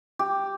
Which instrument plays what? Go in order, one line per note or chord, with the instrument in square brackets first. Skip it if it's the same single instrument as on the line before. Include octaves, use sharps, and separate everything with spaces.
[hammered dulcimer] G4